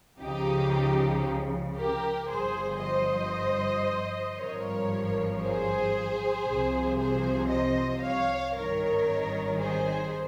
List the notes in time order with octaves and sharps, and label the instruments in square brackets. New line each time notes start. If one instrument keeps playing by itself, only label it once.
[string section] C#2 C#3 F3 D#4 G4
G4 A#4
G1 G2 F3 G#4 C5
C5 D#5
G#1 G2 F3 A#4 C#5
G#4 C5
C2 C3 F3
G#4 C5
C5 D#5
C#5 F5
G#1 G2 D#3 A#4 C#5
G#4 C5